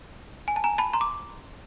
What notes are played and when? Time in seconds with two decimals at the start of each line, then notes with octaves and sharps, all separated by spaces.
0.48 G#5
0.56 A5
0.64 G#5 A#5
0.78 A5 B5
0.93 A#5 C6
1.01 D6